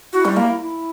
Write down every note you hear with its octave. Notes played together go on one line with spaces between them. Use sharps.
E4 F#4
G3
A#3
E4